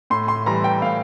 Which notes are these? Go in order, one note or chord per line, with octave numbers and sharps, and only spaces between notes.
A2 C6
C6
E3 G3 A#5
G5
A2 F5